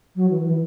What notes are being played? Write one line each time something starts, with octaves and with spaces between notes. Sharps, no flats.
F#3
E3
E3